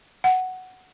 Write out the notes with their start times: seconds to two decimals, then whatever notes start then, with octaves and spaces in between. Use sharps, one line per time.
0.24 F#5